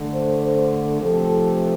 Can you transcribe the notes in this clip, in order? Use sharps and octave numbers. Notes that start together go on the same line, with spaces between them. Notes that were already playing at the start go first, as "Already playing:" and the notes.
Already playing: D3 A3
C5
C5
C3 F3 A3 A4